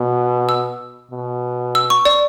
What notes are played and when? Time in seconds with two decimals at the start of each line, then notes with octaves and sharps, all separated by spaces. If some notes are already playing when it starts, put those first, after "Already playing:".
Already playing: B2
0.49 E6
1.11 B2
1.75 E6
1.90 C#6
2.05 D5